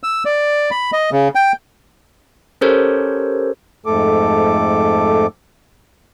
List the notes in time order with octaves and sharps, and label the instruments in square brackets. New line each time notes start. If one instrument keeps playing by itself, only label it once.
[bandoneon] E6
D5
B5
D#5
C#3
G5
[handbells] C#4 G4 A4 A#4 C5 C#5
[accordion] F2 G#2 A3 A4 D6